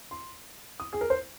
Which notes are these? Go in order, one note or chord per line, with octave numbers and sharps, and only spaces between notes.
C6
D#6
G#4
A#4
C5